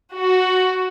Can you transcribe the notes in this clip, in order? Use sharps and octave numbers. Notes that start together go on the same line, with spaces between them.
F#4